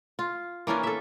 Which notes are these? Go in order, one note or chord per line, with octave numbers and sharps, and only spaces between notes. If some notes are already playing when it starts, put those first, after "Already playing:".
F4
E3 A#3 C#4 D4
A4 E5